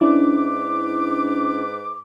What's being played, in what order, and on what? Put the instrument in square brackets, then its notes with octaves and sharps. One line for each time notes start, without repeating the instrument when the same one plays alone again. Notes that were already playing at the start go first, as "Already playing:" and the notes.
[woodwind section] G#2 B4 D6 [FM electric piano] C#4 D4 E4